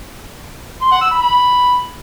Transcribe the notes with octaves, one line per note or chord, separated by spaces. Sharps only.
C6
F#5
E6
B5
B5